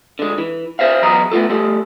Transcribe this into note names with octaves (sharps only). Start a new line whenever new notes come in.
D3 G#3
E3
G#4 C5 E5 F5
E2 F#3 B3 G#4 D#5 A#5
A3 B3 F4 A4
G3 A3 G4 A4